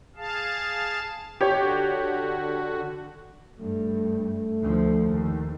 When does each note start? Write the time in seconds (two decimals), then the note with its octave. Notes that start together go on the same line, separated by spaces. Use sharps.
0.16 G#4 F5 A5
1.41 D3 F#4 G4 C#5
3.60 G2 A3
4.62 D2 F3
5.08 D#2